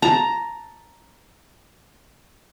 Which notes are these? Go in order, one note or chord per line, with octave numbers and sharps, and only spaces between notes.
A5 A#5